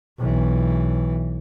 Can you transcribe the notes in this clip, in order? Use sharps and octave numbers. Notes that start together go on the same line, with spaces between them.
B1 E3